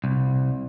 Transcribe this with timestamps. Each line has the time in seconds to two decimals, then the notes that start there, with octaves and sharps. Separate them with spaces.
0.04 C2